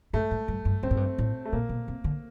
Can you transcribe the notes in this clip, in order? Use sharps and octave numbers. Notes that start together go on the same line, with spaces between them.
G#2 A3
G#2
G2
G2
G2 C4
G#2
G2
A2
A3
A#2 A#3
B2
C3
D3